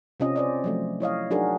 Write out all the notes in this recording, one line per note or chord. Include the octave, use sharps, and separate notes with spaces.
C3 C4 C#4 F4 D#5
C5 D5 D#5
F3 F#3 A3
E4 C#5 D#5 F5
F#3 D4 D#4 F#4 G#4 A#4